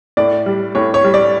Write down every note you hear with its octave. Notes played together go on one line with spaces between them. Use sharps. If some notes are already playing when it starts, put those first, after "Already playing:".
A2 D5
G3
A2 C#5
C#5
G3
D5